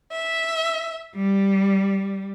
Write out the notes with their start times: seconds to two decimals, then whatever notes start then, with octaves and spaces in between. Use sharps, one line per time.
0.11 E5
1.14 G3